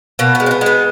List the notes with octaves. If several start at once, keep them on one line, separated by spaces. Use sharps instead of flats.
B2 A#3
G#3 B3
C4
B3
G#3 B3